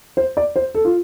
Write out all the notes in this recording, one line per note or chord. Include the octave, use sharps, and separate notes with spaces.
C5
D5
C5
A4
F4